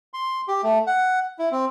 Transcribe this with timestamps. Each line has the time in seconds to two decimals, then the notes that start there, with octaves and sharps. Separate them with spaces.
0.14 C6
0.48 G4
0.63 A3
0.87 F#5
1.39 E4
1.51 C4